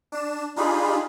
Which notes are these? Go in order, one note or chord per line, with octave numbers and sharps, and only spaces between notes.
D4 E7
D4 D#4 F4 G4 G#4 B5